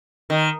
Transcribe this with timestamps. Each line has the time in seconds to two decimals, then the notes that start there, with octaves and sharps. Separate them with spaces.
0.30 D#3